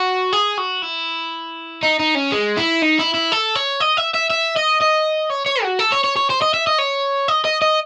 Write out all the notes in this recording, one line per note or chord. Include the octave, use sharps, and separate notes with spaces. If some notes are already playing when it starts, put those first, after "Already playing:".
Already playing: F#4
G#4
F#4
E4
D#4
D#4
C#4
G#3
E4
D#4
E4
E4
A4
C#5
D#5
E5
E5
E5
D#5
D#5
C#5
C#5
F#4
A4
C#5
C#5
C#5
C5
D#5
E5
D#5
C#5
D#5
D#5
D#5